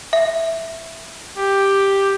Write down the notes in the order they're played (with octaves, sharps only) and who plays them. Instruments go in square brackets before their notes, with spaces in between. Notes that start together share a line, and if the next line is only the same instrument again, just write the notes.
[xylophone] E5
[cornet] G4